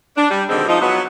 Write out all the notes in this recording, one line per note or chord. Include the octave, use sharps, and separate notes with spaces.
D4
G3
B2 D3 D#3 G3 G#3 C4
F3 D#4
F#3 B3